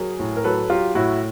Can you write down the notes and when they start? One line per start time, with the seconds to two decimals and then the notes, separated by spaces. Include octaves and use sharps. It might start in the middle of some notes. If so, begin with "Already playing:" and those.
Already playing: F#3 G#4 A#4
0.19 A2
0.36 A#4
0.44 F#3 A4 B4
0.70 F#3 F4 G4
0.95 A2 E4 F#4